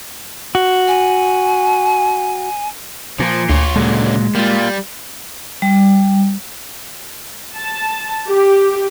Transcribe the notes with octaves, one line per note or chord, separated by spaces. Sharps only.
F#4
G#5
A#2 F3
D2 F4 C#5
C#2 A#2 D3 F#3 G#3
G3 A#3 F4
G3
A5
G4